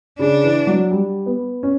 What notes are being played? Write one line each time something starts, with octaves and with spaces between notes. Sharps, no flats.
C#3 D4
E3
F#3
G3
B3
C#4